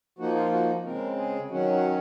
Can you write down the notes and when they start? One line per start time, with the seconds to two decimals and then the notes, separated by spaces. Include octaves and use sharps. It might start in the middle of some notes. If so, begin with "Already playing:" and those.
0.19 F3 A#3 D#4 F#4
0.35 F4
0.52 F#4
0.84 C#3 G#3 C4 A#4
1.17 G#4
1.50 D#3 F#3 C#4 F#4
1.72 F#4